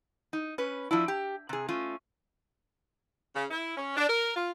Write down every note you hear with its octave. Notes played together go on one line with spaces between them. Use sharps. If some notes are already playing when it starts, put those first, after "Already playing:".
D#4
C#4 B4
F3 D4 E4
G4
C3 G#4
A3 C#4 F4
C#3
E4
C#4
D4
A#4
F4